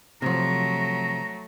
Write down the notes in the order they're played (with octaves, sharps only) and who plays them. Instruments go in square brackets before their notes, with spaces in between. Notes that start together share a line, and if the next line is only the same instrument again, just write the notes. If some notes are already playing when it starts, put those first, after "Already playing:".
[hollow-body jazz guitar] C3 F3 [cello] F#3 A3 [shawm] A#5